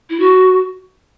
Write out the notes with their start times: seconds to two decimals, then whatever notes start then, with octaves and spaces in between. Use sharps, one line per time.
0.10 E4
0.20 F#4